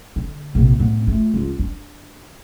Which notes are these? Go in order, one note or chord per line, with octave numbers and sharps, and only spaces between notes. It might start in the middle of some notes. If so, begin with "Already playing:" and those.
D3
A#1 C3
A2 B3
A3 F4
C#2 F4
D4